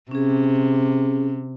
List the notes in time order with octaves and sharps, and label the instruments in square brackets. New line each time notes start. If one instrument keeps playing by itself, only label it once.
[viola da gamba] C3 [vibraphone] C#4 G#4